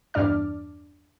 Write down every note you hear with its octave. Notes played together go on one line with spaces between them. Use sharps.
E2 G2 D4 D5 F6